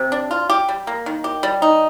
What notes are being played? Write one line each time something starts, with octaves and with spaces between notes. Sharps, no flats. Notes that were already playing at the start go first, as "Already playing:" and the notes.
Already playing: C3
D4
F4
G4
G3
A#3
D#3
G4
G3
D#4